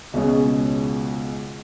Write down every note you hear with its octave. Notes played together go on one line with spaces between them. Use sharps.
C#2 B2 G#3 C#4 G#4